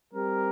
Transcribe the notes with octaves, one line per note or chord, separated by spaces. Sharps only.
G3 C4 G4 A#4